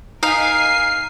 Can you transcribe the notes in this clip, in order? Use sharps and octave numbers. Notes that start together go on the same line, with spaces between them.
D#4 A#4 F5 G#5 B6 C7